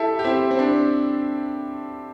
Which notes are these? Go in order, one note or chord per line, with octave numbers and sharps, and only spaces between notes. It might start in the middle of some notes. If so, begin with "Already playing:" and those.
Already playing: E4 G4 A4
G4
C4 E4
C4
D4